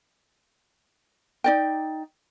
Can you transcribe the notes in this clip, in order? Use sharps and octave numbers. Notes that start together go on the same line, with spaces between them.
D#4 D5 G5